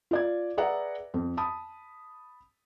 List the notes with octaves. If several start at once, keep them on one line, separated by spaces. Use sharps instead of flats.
F4 D5 G#6
G#4 B4 D5 E5 F#5 A#5
F2
A5 B5 D#6